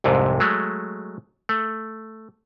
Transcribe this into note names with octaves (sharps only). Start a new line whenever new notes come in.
C2 F2 G#2 C3
F#3 G#3 A3
A3